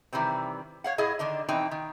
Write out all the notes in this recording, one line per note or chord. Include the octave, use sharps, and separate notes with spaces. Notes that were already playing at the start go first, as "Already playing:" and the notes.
C3 D#3 E3 G3 C4
C#5 F5 F#5
A2 E4 G#4 D#5 F5
D3 D#3 D4 D#5
B2 E3 C4 D#4 G5
D#3